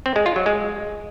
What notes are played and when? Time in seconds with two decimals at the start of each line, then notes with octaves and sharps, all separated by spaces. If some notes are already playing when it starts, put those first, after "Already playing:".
0.06 C4
0.16 G#3
0.26 F4
0.36 F#3
0.46 G#3